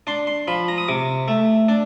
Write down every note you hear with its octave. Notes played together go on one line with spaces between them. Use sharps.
D4 C6
C6
F3 B5
A#5
D#6
C3 D6
A3
D4